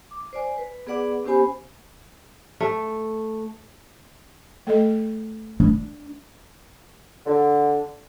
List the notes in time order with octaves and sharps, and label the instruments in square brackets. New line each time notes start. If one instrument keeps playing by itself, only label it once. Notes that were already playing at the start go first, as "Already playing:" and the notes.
[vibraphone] D6
C5 D5 G#5
B4
B3 G#4 B4 D5 F#5 D6
B3 C#4 G4 C5 G#5 B5
[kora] A3
[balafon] A3 A4 D#5
[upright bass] D4
[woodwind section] D3